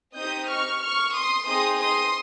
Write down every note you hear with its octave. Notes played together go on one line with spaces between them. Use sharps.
C4 D#4 G4 D#6 G6
C#6 F6
C#6 F6
C6 D#6
C4 D#4 G#4 C6 D#6
C6 D#6